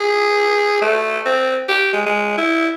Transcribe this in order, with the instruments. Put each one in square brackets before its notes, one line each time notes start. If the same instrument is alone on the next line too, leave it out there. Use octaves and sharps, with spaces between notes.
[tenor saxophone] G#4
A3
C4
G4
G#3
G#3
E4